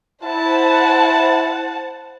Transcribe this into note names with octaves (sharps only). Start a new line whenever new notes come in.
E4 C5 F#5 A5